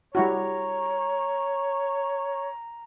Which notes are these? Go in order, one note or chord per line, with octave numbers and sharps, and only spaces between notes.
G3 E4 F#4 C#5 A#5